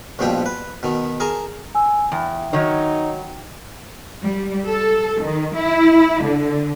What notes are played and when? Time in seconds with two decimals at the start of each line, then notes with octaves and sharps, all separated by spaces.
0.19 A#1 G2 B2 F3 C5 G5
0.46 B4
0.83 B2 D#3
1.20 G#4 A#4 G#5 A5
1.75 G#5 E6
2.12 E2 G5
2.53 D#3 F#3 D#4 C#5
4.23 G3
4.67 A4
5.20 D#3
5.55 E4
6.21 D3